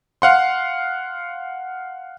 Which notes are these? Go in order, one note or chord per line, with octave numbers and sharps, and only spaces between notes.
F5 F#5 C6